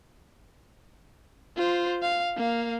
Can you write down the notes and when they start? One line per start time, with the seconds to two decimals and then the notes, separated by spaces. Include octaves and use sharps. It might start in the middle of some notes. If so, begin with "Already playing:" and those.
1.56 F4 C5
2.02 F5
2.37 A#3 F5